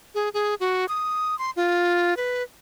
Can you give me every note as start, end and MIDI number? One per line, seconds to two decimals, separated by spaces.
0.15 0.29 68
0.34 0.55 68
0.60 0.86 66
0.89 1.38 87
1.39 1.51 84
1.56 2.17 65
2.17 2.43 71